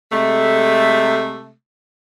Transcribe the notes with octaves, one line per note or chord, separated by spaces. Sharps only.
C3 G#3 A3